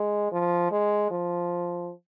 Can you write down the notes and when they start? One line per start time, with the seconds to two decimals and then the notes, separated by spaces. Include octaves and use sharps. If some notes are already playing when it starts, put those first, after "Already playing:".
Already playing: G#3
0.32 F3
0.71 G#3
1.11 F3